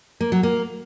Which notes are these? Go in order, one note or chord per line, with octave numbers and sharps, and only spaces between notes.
A#3
F#3
A#3